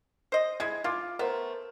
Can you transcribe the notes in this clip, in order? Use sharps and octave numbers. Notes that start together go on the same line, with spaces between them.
C5 D#5
G#3 E4 G#6
F4 F5 C6 D6
A3 B3 A#4 C5